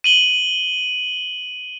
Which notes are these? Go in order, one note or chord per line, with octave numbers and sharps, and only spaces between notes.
D#7 F#7 G7